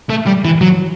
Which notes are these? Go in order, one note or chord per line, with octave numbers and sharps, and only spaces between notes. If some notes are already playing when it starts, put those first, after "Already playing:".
A3
G3
E3
F#3